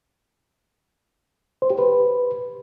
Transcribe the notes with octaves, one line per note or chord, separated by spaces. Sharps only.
C5
G4
B4